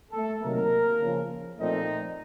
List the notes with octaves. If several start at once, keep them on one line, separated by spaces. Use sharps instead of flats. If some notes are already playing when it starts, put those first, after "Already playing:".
A3 A4
C3 D#3 F#3 A#3 A#4
C#3 F3 A#3
A#2 F3 A3 C4 D#4 D#5